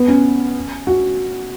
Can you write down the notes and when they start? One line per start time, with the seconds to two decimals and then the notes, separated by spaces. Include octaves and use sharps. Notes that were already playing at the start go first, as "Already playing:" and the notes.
Already playing: B3
0.08 C#4
0.87 F#4